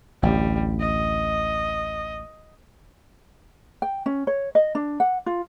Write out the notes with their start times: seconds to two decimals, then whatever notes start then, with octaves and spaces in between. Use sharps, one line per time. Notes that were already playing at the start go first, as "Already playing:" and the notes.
0.23 A1 D2 G3
0.80 D#5
3.82 G5
4.06 C#4
4.27 C#5
4.55 D#5
4.75 D4
5.00 F#5
5.26 F4